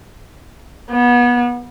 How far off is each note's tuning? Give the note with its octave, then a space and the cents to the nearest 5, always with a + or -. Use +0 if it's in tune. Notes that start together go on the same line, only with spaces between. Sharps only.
B3 -25